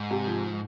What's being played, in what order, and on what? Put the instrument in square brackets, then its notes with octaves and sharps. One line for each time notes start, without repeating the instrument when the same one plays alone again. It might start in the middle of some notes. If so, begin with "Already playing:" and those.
Already playing: [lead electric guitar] G#2
[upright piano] C3
F3